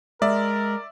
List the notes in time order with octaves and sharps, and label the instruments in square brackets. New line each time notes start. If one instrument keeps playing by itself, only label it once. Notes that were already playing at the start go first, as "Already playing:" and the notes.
[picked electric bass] G#3 [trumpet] A#4 [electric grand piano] D5 [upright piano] E5